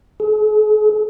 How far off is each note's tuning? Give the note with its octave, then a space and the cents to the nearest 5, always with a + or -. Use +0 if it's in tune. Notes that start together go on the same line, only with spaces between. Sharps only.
G#4 +45